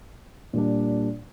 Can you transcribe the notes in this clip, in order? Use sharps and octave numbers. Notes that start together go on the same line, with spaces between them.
A#2 G3 A#3 D4